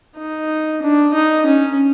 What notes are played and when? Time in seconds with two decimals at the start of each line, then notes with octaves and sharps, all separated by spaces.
0.17 D#4
0.81 D4
1.14 D#4
1.46 C#4